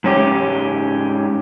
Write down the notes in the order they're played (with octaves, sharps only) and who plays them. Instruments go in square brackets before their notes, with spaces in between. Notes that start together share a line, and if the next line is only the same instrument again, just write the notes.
[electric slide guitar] G#2 C#4 G4